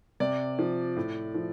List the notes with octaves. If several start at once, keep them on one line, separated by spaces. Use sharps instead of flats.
C3 D5
F3
A2
F3